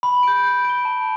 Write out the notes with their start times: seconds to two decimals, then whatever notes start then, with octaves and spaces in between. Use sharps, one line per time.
0.03 B5
0.23 G6 D7
0.44 G6
0.65 D7 G7
0.85 A5